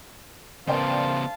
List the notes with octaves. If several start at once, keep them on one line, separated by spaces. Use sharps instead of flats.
C#3 B3 A#4 C5 D5 F5 G5 A5